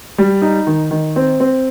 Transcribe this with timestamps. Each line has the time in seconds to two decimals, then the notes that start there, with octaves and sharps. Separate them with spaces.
0.18 G3
0.42 D#4
0.67 D#3
0.91 D#3
1.16 C4
1.40 C4